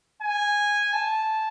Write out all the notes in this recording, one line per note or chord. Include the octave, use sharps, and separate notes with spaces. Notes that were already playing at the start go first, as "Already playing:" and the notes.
G#5
A5